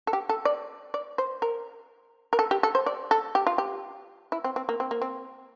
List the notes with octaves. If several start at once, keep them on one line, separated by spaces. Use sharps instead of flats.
A4
G4
A4
D5
D5
C5
A#4
A#4
A4
G4
A4
C5
D5
A4
G4
F4
G4
E4
C4
C4
A#3
C4
A#3
C4